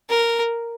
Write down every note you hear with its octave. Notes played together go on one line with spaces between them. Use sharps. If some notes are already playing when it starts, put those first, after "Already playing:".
A#4